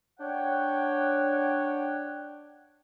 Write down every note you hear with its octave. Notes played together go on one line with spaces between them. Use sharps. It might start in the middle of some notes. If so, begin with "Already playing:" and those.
D4 C#5 F#5 G5